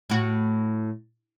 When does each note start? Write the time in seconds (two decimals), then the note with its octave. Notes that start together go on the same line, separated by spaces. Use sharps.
0.10 A2 F#4